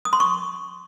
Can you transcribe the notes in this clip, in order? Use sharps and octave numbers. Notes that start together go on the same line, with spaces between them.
D#6
C6
C#6